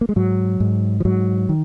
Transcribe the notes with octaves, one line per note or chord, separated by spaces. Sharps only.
A#3
G#3
G#2 F#3
G#2
F3
G#2 F#3
D#3